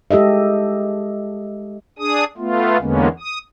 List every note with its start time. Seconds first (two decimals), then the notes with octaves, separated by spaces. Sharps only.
0.11 G#3 G4 A4 D#5 E5
1.99 D4 G#4 D#6
2.38 A3 B3 F4
2.80 E2 D3 G#3 A#3 B3 C#4
3.20 D#6